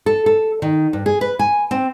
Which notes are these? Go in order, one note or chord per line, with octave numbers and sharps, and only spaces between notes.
A4
A4
D#3
G2
G#4
B4
G#5
C4